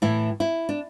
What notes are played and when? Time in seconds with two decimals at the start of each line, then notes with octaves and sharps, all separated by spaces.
0.02 A2 E3 E4
0.40 E4
0.69 D4